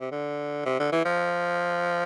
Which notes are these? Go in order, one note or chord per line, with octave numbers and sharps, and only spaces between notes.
C3
D3
C3
D3
E3
F3